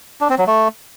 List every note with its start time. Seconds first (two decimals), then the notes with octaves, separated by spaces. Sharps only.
0.21 D4
0.30 C4
0.38 F#3
0.47 A3